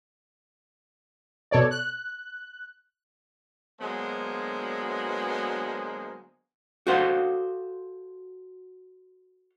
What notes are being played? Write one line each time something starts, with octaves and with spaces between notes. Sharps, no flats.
B2 A4 C#5 D5
F#6
D3 F#3 G#3 A#3 B3 C5
F#4 A4 C5 F5 F#5